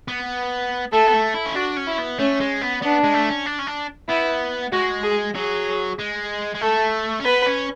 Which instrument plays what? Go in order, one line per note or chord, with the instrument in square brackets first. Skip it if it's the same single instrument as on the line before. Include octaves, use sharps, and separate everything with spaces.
[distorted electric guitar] B3
[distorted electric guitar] A3 [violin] A4
[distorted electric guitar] B3
A3
E4
C#4
[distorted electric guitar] D4 [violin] F#4
[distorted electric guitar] C#4
[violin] E4
[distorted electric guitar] B3
[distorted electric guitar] A3 [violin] C#4
[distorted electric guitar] G#3
B3
[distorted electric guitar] B3 [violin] D4
[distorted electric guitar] G#3
A3
C#4
D4
C#4
D4
[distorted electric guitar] B3 [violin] E4
[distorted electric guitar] G#3 [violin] F#4
[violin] G#4
[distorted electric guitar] F#3 [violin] G#4
[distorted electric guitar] G#3
G#3
[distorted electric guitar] A3 [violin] A4
[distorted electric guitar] C#4
[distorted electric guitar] B3 [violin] B4
[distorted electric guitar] C#4